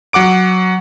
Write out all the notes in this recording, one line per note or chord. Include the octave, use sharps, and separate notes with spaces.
F#3 F#5 D6 D7